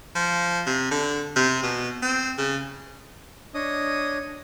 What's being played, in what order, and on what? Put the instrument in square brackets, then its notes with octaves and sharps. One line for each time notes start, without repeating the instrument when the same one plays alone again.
[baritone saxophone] F3
C3
D3
C3
B2
C4
C#3
[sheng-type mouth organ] D4 C#5 D#5 D#6